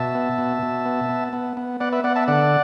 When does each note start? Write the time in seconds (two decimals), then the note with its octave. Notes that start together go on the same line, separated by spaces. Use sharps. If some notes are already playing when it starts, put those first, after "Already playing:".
Already playing: B2 E5 A5
0.15 B3
0.38 B2
0.63 B2
0.86 B3
1.09 B3
1.33 B3
1.57 B3
1.80 B3 D5 F#5
1.93 B4 E5
2.04 B3 D5 F#5
2.16 E5 A5
2.28 D3 D5 F#5